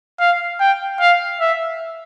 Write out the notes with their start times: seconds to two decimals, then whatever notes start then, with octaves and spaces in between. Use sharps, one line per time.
0.20 F5
0.60 G5
1.01 F5
1.40 E5